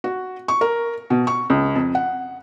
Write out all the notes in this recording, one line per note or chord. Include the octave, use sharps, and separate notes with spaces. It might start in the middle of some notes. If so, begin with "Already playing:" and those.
F#4
C#6
A#4
B2
C#6
C#2
F2
F#5